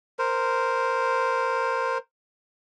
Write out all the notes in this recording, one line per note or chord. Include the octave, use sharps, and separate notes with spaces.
A#4 C5